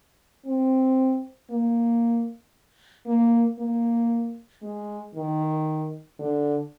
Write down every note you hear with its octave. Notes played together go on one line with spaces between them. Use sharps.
C4
A#3
A#3
A#3
G#3
D#3
D3